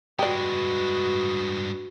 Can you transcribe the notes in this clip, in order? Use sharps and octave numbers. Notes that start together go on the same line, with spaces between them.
G2 G#3 F#4 G4 B4 D5